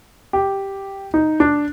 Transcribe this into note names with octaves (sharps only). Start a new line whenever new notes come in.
G4
D#4
D4